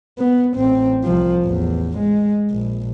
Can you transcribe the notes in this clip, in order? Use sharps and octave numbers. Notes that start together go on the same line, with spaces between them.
B3
A1 C4
C2 F3
A1 E2
G#3
A#1